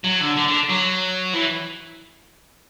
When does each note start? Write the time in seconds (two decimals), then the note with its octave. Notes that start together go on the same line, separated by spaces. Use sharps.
0.04 F#3
0.21 D3
0.36 D3
0.47 D3
0.69 F#3
1.33 E3